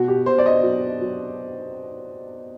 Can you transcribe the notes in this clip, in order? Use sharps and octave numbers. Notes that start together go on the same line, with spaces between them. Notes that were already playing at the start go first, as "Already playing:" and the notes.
Already playing: B2 F#4
G4
B2 C5
D5
D#5
F#3
F#3